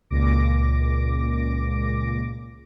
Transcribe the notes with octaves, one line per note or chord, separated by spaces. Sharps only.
C#2 A#2 D6 A#6 D7